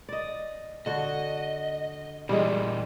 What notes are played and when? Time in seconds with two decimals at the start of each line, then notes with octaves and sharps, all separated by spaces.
0.09 D5 D#5
0.86 D3 F#4 D#5
2.29 A#2 E3 G3 G#3